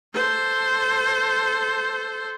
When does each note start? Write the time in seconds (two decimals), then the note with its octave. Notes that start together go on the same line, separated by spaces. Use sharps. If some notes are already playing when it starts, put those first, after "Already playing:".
0.14 A4 C5